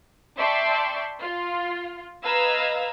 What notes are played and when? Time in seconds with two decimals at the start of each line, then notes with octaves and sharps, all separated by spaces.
0.38 D5 E5 G5 A5 C6 C#6
1.20 F4
2.24 B4 D#5 F5 A#5 E6 G#6